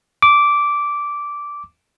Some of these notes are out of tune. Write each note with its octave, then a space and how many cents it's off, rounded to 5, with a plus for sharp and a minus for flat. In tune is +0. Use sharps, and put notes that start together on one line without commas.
D6 -10